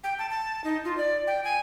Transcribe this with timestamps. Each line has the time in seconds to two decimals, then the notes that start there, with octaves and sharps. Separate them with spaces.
0.04 G5
0.19 A5
0.30 A5
0.64 D#4
0.85 F4
0.97 D5
1.27 G5
1.44 G#5